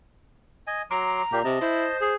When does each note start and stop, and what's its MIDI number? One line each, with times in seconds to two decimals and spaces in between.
0.67 0.82 75
0.67 0.82 80
0.91 1.22 54
0.91 1.48 82
0.91 1.22 84
0.91 1.22 86
1.32 1.43 46
1.32 1.40 58
1.32 1.40 67
1.44 1.57 48
1.44 1.97 75
1.44 1.97 81
1.61 1.87 64
1.61 2.14 72
2.01 2.16 68